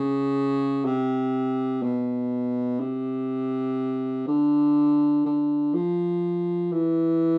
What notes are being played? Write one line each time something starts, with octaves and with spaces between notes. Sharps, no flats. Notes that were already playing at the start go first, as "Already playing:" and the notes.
Already playing: C#3
C3
B2
C3
D3
D3
F3
E3